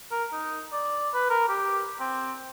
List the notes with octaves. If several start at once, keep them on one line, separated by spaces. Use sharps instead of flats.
A#4
D#4
D5
B4
A#4
G4
C4